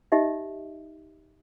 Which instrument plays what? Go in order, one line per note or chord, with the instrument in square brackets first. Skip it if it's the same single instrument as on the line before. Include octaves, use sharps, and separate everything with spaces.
[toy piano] D#4 G4 D#5 E5